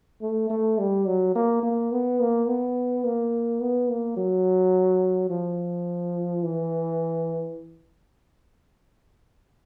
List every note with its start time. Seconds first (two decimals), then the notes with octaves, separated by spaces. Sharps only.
0.22 A3
0.50 A3
0.79 G3
1.06 F#3
1.35 A#3
1.63 A#3
1.92 B3
2.20 A#3
2.48 B3
3.04 A#3
3.61 B3
3.89 A#3
4.17 F#3
5.30 F3
6.43 E3